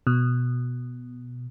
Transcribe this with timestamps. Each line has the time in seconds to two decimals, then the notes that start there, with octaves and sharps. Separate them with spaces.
0.07 B2